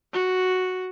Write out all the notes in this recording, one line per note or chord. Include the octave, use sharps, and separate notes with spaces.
F#4